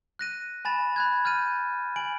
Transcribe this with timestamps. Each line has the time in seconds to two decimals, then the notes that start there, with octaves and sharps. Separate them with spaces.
0.19 F#6 A#6 D#7
0.65 G#5 B5 A6 E7
0.96 B5 F#6 G#6
1.25 F6 G6 A6 D#7
1.96 G#5 D7 F#7